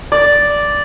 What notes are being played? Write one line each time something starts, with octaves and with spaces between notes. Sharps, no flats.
D5